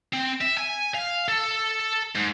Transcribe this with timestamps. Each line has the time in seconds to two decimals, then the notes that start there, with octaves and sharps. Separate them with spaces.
0.13 C4
0.41 E5
0.57 G#5
0.94 F5
1.28 A4
2.16 G#2